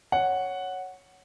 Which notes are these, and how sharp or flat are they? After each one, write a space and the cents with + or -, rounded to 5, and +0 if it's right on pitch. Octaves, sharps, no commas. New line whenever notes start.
C#5 +0 F#5 +0